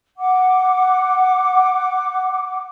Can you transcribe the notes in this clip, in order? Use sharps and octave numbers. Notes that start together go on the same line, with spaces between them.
F#5 D6